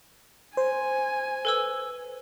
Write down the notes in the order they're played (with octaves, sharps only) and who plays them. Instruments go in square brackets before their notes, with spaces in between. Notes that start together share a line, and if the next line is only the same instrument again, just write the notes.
[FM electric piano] C5 [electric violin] G#5
[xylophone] A4 B4 E6